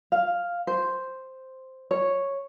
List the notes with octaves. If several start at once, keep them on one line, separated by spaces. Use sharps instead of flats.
F5
C5
C#5